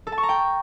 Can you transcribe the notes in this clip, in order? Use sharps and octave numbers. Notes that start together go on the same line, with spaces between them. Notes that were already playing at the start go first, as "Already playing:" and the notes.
A4
A5
C#6
A#5
G5